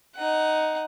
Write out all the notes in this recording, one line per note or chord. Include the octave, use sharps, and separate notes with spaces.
D#4 F#5